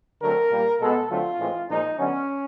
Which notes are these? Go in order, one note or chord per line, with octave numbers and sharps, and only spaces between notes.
D3 F#3 A3 C4 A#4
A#2 G3 A#3
B2 G#3 B3 A4
D3 F#3 A3 C4 F4
A2 E3 G#3 C4
A#2 F3 G#3 D#4
D3 F#3 B3 C#4